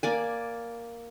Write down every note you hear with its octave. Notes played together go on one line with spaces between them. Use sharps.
A#3 D5 G#5